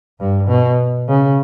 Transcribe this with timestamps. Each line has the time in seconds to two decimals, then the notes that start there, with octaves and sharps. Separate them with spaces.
0.20 G2
0.48 B2
1.08 C#3